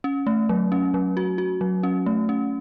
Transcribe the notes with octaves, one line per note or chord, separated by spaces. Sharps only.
C#4
A3
F#3
C#4
F#3
F#4
F#4
F#3
C#4
A3
C#4